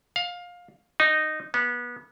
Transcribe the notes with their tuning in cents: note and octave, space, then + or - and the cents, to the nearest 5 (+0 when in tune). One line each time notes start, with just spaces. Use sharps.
F5 +20
D#4 -10
B3 -25